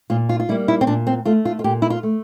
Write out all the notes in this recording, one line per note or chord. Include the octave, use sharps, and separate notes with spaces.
A#2 F4
F4
F4
G3 A#3 E4
E4
C4
A#2 D4
C4
A3 F4
F4
F4
A#2 G4
E4
F4
A3